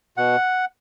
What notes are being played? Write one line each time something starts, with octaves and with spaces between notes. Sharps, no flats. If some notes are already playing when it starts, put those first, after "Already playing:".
B2 F#5